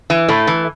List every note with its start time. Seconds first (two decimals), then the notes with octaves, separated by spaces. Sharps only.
0.10 E3
0.29 A2 A3
0.47 E3